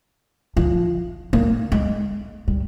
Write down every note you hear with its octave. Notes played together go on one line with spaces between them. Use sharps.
F3
A#3
G#3
G3